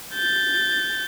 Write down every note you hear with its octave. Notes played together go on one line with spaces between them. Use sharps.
G6 A6